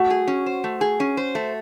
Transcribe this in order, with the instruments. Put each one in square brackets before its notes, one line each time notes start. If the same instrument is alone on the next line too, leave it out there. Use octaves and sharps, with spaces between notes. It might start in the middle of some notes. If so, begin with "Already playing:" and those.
Already playing: [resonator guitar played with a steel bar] A3 [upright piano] F#4
[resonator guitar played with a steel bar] G#4
C#4
C5
A3
G#4
C#4
C5
A3